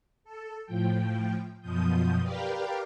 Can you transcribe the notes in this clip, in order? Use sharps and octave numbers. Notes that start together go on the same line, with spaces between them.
A4
A2 F3 G5
F#2 B2 F3 D#6 G6
G4 A#4 B4 D5 F5 G5